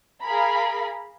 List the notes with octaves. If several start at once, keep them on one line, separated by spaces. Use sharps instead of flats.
G#4 A#4 F5 A#5 B5